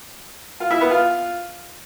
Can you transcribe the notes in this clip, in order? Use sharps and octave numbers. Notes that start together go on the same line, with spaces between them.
F4
E4
B3
F4